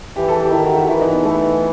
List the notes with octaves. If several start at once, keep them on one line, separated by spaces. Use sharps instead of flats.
E3 G4
A4
G4
D#3 E4
F#4
F#4
E3 E4
D#4
B3
A3